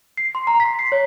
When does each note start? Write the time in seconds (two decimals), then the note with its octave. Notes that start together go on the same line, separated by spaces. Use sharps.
0.17 C7
0.35 C6
0.47 A#5
0.60 B6
0.79 C7
0.92 C#5